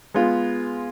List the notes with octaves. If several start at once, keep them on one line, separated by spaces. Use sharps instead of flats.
G#3 B3 F4